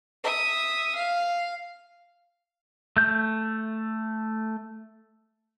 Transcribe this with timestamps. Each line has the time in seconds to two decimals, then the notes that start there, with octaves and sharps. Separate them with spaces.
0.23 E5 D#6
0.95 F5
2.97 A3 G6